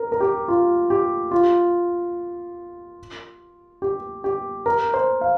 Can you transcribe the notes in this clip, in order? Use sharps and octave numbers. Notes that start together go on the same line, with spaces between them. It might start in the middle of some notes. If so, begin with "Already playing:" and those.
Already playing: A#4
A#4
G4
F4
G4
F4
G4
G4
A#4
C5
F5